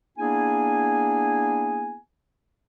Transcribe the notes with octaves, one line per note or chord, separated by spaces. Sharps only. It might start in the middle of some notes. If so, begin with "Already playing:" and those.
A#3 B3 D4 E4 G#4 G#5